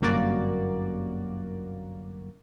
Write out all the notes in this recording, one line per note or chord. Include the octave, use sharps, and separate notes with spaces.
G1 C2 F#2 A#3 F#4 D5